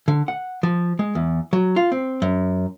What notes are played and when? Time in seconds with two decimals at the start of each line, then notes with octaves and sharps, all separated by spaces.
0.08 D3
0.28 F#5
0.63 F3
0.99 G#3
1.15 E2
1.53 F#3
1.76 F4
1.92 C4
2.22 F#2